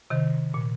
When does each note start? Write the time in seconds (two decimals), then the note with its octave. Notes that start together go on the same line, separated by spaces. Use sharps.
0.10 C3 D#3
0.54 A#2